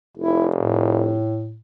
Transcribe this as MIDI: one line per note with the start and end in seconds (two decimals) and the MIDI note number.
0.18 1.19 29
0.18 0.47 64
0.56 1.58 45